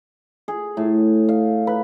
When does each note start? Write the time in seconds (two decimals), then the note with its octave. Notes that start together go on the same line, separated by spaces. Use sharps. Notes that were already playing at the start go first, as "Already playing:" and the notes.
0.48 G#4
0.77 A2
1.29 F5
1.67 B4